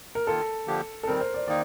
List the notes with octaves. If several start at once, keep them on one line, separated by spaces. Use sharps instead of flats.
A#4
D#3 A#3 F4 A4
D3 F3 A#3 D4 G4
A4
D#3 G3 C4 A#4
C5
D5
D#3 A#3 D#4 D5